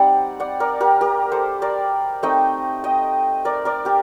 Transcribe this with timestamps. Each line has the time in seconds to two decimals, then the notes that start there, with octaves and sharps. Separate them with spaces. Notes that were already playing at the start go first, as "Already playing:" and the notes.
Already playing: G3 C4 D#4 D5 F#5
0.40 D5 F#5
0.60 A#4 D5
0.80 G4 A#4
1.01 G4 A#4
1.32 A4 C5
1.62 A#4 D5
2.23 A3 C4 D#4 D#5 G5
2.84 D#5 G5
3.45 A#4 D5
3.65 A#4 D5
3.85 G4 A#4